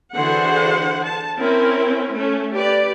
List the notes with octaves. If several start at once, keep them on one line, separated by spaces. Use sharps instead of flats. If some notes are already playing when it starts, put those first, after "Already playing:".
D3 E3 F#4 G#4 C5 F#5
A5
C4 C#4 E4 A#4
A3 C#4
G4 B4 D5